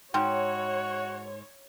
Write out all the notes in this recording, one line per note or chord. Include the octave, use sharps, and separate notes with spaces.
G#2 F#4 C#5 G5